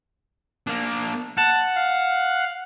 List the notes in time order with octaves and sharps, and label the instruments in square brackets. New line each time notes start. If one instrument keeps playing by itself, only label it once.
[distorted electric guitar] A#3 D4
[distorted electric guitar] F#5 [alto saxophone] A5
[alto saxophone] F5